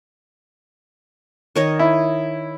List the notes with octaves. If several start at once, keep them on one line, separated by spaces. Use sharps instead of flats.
D#3 C#5 D#5
E4